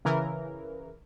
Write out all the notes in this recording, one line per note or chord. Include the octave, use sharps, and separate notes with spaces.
C#3 E3 A#4